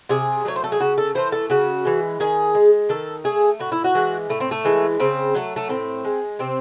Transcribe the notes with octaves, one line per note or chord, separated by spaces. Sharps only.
C3 G#4
F#3 A3 C#5
C5
A4
G#4
C#3 F#4
A4
E3 A3 C5
A4
C#3 F#4
E3 G#3
D#3 G#4
G#3
D#3 A4
A3 G#4
A2 F#4
E4
F#4
E3 G#3
A2 A3
C4
A3
E3 G#3
C#3 C4
F#3 A3
A3
A2 C4
G#3
C3 C4